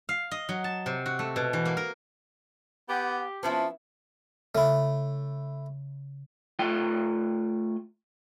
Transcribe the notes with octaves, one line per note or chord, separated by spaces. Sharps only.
F5
D#5
F#3
A5
C3
F#4
A3
B2
E3
A#3
A#4
B3 G4 F#5
F3 B3 C#4 E4 A5
C#3 A3 E4
A3 F4 G5